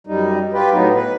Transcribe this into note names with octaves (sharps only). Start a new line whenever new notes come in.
F#2 G3 D#4
F4 G4 B4
A2 F#3 B3 D#4
B4